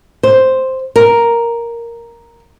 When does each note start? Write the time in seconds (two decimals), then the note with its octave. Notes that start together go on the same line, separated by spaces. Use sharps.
0.23 C5
0.96 A#4